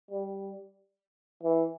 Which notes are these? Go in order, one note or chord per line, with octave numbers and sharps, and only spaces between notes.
G3
E3